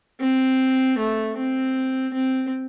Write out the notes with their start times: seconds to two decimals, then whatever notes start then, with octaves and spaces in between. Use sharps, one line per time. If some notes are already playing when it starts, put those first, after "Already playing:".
0.20 C4
0.98 A3
1.36 C4
2.14 C4